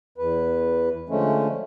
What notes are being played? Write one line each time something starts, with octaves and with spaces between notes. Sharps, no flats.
E2 B4
D3 F3 G#3 A3 C#4